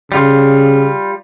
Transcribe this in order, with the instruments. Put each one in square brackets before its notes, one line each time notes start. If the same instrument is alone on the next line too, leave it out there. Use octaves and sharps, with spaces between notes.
[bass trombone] C#3 [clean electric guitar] G3 F4